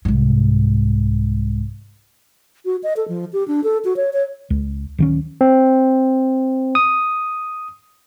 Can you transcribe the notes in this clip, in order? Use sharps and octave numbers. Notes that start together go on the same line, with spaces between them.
C2 G#2
F#4
D#5
A4
F3
G4
D4
A4
F#4
C#5
C#5
C#2
D1 D#3 C#4
C4
D#6